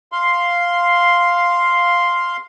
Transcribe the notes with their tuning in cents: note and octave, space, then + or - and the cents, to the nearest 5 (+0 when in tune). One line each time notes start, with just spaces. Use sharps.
F5 +0 C6 +0